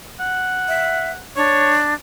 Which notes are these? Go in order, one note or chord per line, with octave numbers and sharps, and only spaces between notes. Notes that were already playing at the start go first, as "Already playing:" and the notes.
F#5
E5
D4 C#5